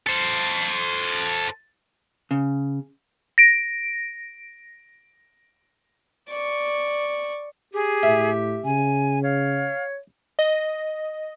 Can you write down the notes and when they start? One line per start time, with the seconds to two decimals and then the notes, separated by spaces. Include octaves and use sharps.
0.06 A4 C5
2.31 C#3
3.38 A#6 D7
6.30 D5 C#6
7.74 G4 G#4
8.03 A2 E5
8.65 C#3 G#5
9.23 C#5 F5
10.39 D#5